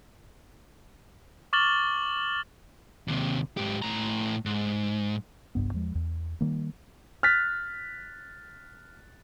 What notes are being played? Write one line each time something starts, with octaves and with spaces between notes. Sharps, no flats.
C#6 D6 F6 A6 F#7 G7
D#2 C3
G#2 G4
A2 A#5
G#2
G1 C2 G2 B3
E2 F3 G#3
E2
D#3 G3 A#3
F6 F#6 A6 B6